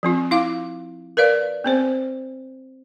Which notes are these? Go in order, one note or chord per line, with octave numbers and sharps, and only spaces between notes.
F3 C4 F4
E4 F5 D6
A#4 B4 D5 F5
B3 C4 C5